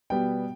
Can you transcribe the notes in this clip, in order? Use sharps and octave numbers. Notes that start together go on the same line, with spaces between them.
B2 G3 B3 G5